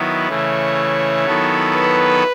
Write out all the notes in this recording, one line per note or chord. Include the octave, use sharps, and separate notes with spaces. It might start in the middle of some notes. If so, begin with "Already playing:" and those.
Already playing: D#3 F#3 B3 E4
C#3 E3 A3 C#5
D#3 F#3 B3 E4 A4
B4